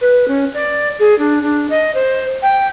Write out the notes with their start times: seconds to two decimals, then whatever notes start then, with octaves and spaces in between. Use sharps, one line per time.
0.01 B4
0.28 C#4
0.54 D5
0.99 G#4
1.18 D4
1.42 D4
1.70 D#5
1.94 C5
2.42 G5